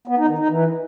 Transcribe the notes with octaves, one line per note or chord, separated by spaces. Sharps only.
B3
D#4
D#3
D#4
E3